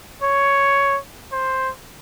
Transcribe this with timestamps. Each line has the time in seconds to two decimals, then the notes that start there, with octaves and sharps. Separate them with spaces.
0.22 C#5
1.32 C5